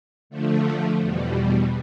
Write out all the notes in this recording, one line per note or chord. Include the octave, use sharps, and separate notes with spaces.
D3 F3 A3
E2 B2 G3